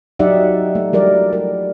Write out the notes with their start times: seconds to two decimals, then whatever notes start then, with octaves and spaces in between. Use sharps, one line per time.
0.19 F#3 D#4 G4 D5 E5 F#5
0.75 A3
0.93 F3 G3 A#4 D5
1.33 A#4